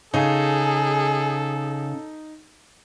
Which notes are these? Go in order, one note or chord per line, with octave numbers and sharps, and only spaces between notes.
C#3 D#4 G#4 A4